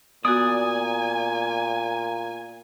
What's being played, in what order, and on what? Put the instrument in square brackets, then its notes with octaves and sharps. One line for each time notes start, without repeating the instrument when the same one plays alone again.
[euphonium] A#2 [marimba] B3 F#4 [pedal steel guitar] D5 D#6 [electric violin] G#5